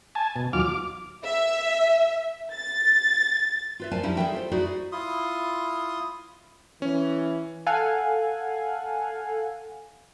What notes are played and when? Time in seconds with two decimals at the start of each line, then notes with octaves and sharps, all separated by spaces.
0.15 G#5 A5
0.36 B2
0.53 D#2 F#3 F4 D6 F6
0.65 D6
1.24 E5
2.53 A6
3.80 F4 B4 E5
3.91 A#4 C5 D5 F5 G#5 A5
4.03 F3 G3 C#4 D#4 E4
4.17 G#4 A4 B4 C#5 E5 G5
4.33 F4 A4 C5
4.51 D#4 E4 F#4 G#4 B4 D5
4.92 E4 F4 C6 D#6
6.82 E3 C#4
7.66 A4 F5 F#5 G#5